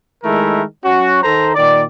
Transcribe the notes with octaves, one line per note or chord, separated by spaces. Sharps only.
D#3 G#3 A3 E4 A#4
F#3 C#4 F#4
D#3 A4 C5 A#5
A#2 D#3 D5